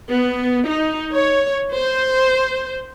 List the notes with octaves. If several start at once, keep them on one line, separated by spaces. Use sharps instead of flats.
B3
D#4
C#5
C5